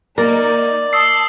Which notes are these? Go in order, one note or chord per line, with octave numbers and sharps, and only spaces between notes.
A#3 D#4 A#4 D5
A5 D#6 E6 C7